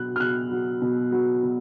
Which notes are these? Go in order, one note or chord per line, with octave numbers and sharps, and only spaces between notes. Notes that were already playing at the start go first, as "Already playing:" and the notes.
Already playing: B2 F#3 F#6
F6
B2 F#6
F#3
B2
F#3
B2